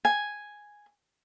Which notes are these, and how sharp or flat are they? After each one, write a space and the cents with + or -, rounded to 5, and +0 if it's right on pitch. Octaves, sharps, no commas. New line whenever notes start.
G#5 +0